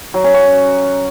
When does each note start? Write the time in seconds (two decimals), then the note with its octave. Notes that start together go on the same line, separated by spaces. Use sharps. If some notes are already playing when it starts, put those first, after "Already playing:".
0.14 F#3
0.24 C#4
0.34 F#4